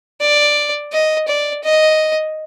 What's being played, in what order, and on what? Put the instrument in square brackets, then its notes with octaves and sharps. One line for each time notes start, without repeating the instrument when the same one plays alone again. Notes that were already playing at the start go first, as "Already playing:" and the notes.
[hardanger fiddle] D5
D#5
D5
D#5